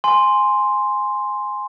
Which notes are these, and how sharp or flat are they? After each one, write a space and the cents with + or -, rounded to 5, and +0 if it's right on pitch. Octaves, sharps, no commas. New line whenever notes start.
G#5 +0 C6 +0